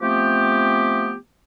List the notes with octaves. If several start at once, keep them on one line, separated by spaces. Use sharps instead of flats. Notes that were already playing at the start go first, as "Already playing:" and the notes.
F3 A3 B3 C4 G4